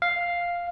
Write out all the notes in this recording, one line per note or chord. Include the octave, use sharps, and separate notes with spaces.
F5